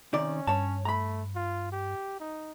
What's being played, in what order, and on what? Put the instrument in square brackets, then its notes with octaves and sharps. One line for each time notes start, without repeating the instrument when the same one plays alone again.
[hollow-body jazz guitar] C3 D#3 D5 [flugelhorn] C#4
[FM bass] G2 [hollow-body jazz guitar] C#5 A5
[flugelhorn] A3 [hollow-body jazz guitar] A#5 B5
[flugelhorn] F4
G4
D#4